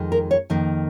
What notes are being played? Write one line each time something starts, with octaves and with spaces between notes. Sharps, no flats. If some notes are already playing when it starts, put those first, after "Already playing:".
Already playing: F2 D#3 G#3
A#4
C#5
F2 D#3 A#3